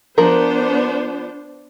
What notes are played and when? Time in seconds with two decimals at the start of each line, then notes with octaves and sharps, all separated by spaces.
0.18 F3 B3 D4 A#4 C5